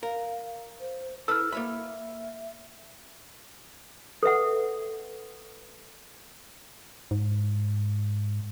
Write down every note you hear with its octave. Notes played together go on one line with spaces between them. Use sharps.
A#4 F5
C5
E4 A4 B4 E6 F6
A#3 C#5 E5 B5
A4 B4 E5 F#5
G#2